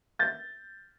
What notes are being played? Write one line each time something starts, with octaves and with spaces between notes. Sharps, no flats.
G6 A6